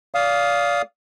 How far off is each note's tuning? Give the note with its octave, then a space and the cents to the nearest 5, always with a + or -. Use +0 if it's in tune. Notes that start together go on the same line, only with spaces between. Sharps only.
D5 -25 F5 +0 D#6 +5